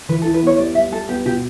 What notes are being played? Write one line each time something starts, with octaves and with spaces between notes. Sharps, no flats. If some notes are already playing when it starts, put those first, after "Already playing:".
E3 B4
A4
E4
B4
B3 C#5
G3 D5
G3 E5
G3 A4
B3 G4
B2 G4